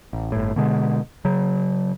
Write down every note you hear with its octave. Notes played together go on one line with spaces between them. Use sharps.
A1
G1 A2
B2 D3 G#3
C#3 F#3